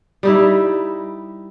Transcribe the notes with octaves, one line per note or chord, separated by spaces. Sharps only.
G3 D#4 E4